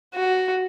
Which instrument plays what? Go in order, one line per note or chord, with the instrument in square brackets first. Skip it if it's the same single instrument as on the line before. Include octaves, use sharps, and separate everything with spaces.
[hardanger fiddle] F#4